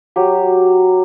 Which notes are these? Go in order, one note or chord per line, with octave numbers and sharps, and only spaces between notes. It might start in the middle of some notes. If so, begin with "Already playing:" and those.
F#3 G4